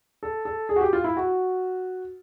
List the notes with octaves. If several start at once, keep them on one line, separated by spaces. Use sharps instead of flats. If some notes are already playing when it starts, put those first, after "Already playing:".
A4
A4
G#4
F#4
G4
F4
E4
F#4